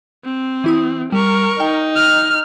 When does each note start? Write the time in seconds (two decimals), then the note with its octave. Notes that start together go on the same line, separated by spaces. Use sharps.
0.24 C4
0.64 E3 E4 D#6
1.12 G3 A#4 C#6
1.60 D#4 G5
1.96 F6